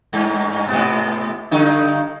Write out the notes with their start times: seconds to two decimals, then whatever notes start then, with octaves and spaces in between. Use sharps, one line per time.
0.13 G2
0.68 G#2 C3 B3
1.51 G2 D3 D#4